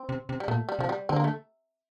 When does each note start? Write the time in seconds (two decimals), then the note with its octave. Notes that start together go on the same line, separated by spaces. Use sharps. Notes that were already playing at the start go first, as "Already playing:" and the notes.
Already playing: C4
0.09 C3
0.29 C3
0.40 G3
0.48 A#2 A3
0.69 G3
0.79 C3 F3
0.89 G3
1.09 D3 C4
1.16 A#3
1.24 A3